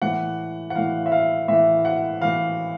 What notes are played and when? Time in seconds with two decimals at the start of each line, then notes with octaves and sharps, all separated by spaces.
0.01 A2 E3 F#5
0.70 F#5
0.75 A2 E3 F5
1.06 E5
1.12 F5
1.48 A2 E3 E5
1.85 F#5
2.22 A2 E3 F5